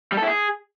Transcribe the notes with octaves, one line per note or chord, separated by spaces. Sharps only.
G3
A4
E4
G#4